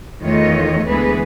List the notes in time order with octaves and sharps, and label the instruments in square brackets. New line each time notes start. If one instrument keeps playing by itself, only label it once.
[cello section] E2 D#3 A3 F4 C#5 D#5
D2 E3 G#3 B3 G#4 B4